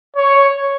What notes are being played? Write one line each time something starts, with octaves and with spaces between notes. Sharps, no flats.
C#5